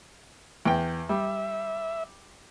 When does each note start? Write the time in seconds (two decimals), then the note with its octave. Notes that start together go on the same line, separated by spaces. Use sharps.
0.65 E2 G5
1.09 G3 E5